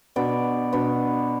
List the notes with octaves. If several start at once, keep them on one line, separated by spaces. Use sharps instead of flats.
B2 B3 D4 D5
B2 B3 D4